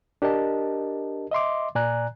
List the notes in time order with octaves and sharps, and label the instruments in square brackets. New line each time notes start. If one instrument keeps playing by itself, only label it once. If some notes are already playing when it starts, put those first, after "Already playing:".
[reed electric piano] D4 G4 A#4 D#5 A5
D#5 E5 C6 D6
A#2 D5 G#5 A#5 F#6